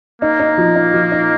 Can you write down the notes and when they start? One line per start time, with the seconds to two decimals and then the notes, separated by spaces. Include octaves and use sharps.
0.22 A#3 D#4
0.40 D#4
0.58 F3
0.76 D#4
0.94 F3
1.12 D#4